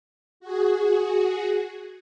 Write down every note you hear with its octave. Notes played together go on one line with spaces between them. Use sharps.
F#4 G#4